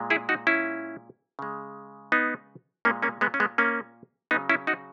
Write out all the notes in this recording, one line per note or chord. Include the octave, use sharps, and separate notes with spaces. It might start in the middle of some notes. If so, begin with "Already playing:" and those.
Already playing: A#2 G#3
E4 G#4
D#4 F#4
C#4 E4
C#3 G#3
B3 D#4
A#2 G#3 A#3 C#4
A#3 C#4
G#3 B3
C#4
G#3 B3
A#3 C#4
C#3 F#3 B3 D#4
C#4 E4
D#4 F#4